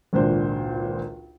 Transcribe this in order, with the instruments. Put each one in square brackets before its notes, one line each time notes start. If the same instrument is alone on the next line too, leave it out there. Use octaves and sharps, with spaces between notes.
[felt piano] G#1 C#2 A#2 D4 C5